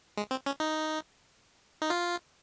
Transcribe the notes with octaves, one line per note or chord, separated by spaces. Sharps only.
G#3
C4
C#4
D#4
D#4
F4